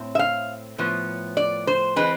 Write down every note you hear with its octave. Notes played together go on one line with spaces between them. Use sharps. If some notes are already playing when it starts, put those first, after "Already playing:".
Already playing: A2 C4
E5
F5
A2 F3 B3
D5
C5
E3 G#3 C4 B4